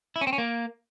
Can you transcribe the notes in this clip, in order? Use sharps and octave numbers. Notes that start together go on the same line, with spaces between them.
E4
C#4
C4
C#4
A#3